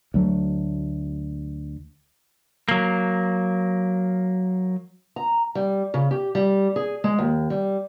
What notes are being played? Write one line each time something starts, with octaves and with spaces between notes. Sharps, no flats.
D2 F#3 A3
F#3 A#3
A#5
G3
C#3
G4
G3
G#4
G#3
D#2
G3